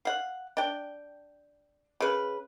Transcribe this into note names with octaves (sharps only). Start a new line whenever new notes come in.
F5 F#5
D4 G5
C#3 B4